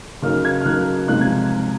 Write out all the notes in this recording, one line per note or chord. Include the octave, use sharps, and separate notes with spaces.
C#3 F#3 A#3 D#4 F6
G#6
F6
C#3 F#3 A#3 D#4 F#6
C3 F3 G#3 D#4 F#6
G#6